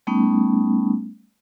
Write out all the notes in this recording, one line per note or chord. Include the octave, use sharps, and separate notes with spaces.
G3 A3 B3 C#4 D#4